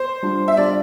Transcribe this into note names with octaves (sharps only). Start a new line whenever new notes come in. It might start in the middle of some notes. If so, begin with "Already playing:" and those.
Already playing: C5
G3 D4 F4
E5
G3 D4 F4 D5